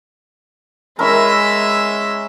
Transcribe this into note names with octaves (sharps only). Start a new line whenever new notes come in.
G#3 C#4 E4 A#4 E5